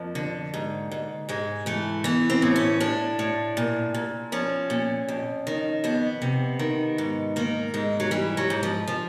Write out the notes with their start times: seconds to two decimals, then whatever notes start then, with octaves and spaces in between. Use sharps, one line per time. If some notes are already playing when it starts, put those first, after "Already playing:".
Already playing: F2 F3 A#3
0.15 D3
0.54 G#2
0.92 G#2
1.29 G#2 G#3
1.66 E3 A3
2.04 E3 B3
2.30 C4
2.42 A2
2.56 C#4
2.80 A2 D4
3.19 A2
3.57 A#2
3.94 A#2
4.32 F3 C#4
4.70 A#2
5.08 F2
5.47 D#3
5.84 F2 B3
6.22 C3
6.59 D#3
6.98 G#2
7.36 D#3 A#3
7.74 G#2 G#3
8.00 F#3
8.11 E3 G3
8.37 F#3
8.50 G#2
8.63 F3
8.88 F3